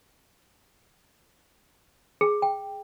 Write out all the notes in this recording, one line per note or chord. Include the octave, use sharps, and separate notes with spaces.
G#4
G5